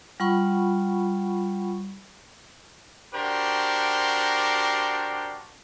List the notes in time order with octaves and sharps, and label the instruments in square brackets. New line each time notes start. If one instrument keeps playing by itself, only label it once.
[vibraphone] G3 F4 F#5 B5 C#6
[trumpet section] D4 F#4 G4 A#4 C5